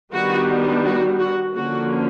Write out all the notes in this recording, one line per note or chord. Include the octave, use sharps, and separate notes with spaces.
D#3 G3 B3 D4 F#4
F#4
F#4
D3 F3 A#3 C#4 F#4